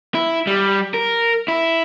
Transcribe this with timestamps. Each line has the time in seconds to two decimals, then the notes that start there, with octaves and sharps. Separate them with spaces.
0.15 E4
0.47 G3
0.94 A#4
1.48 E4